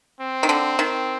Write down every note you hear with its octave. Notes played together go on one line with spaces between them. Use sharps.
C4
D#3
D3
D#3